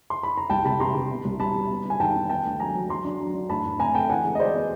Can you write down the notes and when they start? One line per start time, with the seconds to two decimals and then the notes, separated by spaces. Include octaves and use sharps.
0.10 C6
0.23 B5
0.37 A#5
0.50 C2 G5 A5
0.64 C3 A5 B5
0.80 C3 A#5 C6
0.95 C3
1.10 B2
1.25 C2
1.40 G3 A5 B5
1.55 G3
1.70 B3
1.85 G3 G#5
2.00 D#3 G5 A5
2.15 B3
2.30 B3 G5 A5
2.45 D2
2.60 F#3 G#5 A#5
2.75 F#3
2.89 F#3 A#5 C6
3.05 D4
3.20 F#3
3.34 D4
3.50 A2 A5 B5
3.65 A2
3.79 C4 G#5 A#5
3.95 A3 G5 A5
4.10 E3 F#5 G#5
4.24 G#3
4.35 D#5
4.39 G#3 C5 D5
4.55 B3